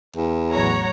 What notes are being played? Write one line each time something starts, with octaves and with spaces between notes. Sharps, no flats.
E2
A1 F#3 C#5 F#5 A#5